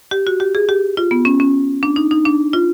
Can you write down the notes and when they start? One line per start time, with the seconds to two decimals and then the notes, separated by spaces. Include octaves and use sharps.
0.11 G4
0.27 F#4
0.40 G4
0.55 G#4
0.69 G4
0.97 F4
1.11 B3
1.25 C#4
1.40 C#4
1.83 D4
1.96 D#4
2.11 D#4
2.25 D4
2.53 F4